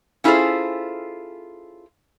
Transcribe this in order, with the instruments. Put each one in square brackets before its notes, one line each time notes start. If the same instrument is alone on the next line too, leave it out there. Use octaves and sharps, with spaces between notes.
[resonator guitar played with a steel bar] C#4 E4 F4 G#4 A4 C5